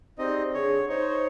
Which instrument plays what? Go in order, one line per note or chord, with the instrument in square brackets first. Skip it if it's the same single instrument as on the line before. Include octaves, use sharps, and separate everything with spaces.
[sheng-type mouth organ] C4 D#4 D#5 [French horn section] G4 G#4 D5
[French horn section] D3 G#4 [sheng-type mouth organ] C#5
[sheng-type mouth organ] D#4 C#5 [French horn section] C5